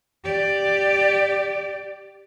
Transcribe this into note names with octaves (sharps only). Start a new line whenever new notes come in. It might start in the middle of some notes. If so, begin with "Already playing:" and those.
G4 D5